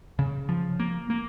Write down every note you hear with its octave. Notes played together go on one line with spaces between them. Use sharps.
C#3
F3
A#3
A#3